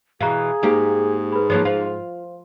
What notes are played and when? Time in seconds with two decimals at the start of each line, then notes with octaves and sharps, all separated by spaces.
0.21 B2 E3 G#4 F5 A#5
0.63 G#2 A#3 G4
1.32 B4 B5
1.50 F3 F#3 A#3
1.65 F4 C5 F5